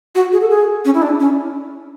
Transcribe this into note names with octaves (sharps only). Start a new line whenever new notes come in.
F#4
G#4
A4
G#4
C#4
E4
D4
C#4